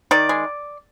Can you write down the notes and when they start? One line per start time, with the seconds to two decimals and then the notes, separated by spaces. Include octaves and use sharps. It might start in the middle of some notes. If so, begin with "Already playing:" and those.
0.11 D#3 D5
0.29 G#3